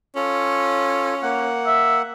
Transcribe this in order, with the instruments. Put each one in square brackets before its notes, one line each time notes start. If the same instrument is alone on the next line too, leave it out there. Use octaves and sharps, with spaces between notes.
[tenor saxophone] C#4 [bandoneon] F4 A4
[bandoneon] A#3 F#5
[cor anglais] E5